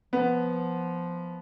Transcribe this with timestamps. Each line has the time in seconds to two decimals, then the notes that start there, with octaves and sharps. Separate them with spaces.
0.13 F3 B3